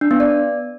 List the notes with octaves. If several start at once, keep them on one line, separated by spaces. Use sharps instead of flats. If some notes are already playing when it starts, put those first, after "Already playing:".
D4
B3
D5